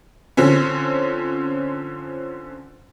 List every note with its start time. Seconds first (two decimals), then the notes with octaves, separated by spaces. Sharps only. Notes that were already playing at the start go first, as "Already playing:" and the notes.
0.37 D3 F3 C4 C#4